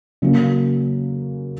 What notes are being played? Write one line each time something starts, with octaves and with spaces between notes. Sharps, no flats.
C#3 F#3 A#3 C#4